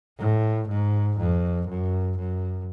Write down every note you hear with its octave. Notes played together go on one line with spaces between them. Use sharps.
A2
G#2
F2
F#2
F#2